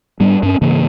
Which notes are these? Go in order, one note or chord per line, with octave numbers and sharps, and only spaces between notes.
G#2 G3 B3 D4
G2 C#4
G#2 C#3 E3 A#3